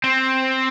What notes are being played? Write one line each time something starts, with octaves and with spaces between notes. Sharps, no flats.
C4